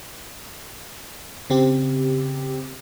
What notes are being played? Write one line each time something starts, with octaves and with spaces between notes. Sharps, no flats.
C#3 C4 G4